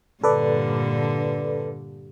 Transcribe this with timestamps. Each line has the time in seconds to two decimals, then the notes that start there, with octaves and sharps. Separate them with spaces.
0.23 G2 A#2 D3 A4 B4 D5